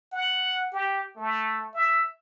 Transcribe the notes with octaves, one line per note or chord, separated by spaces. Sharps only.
F#5
G4
A3
E5